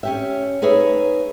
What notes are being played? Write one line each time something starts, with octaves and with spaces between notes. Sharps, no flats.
C#4 G4 E5
D#4 G#4 B4 C#5 E5